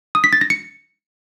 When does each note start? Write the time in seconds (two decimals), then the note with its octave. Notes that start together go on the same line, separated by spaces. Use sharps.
0.15 D#6
0.24 B6
0.33 A6
0.41 A#6
0.50 C#7